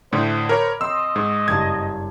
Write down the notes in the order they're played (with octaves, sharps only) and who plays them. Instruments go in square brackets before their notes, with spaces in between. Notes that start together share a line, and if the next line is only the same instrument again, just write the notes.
[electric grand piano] A2 D3 [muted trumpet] C5
[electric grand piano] A#4 C#5 [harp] B5 D6 F#6
[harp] C4 [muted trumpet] D#5 [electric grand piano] C6 E6
[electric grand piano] G#2 [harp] C5 C#6
[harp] F#1 G2 A5 [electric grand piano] G#6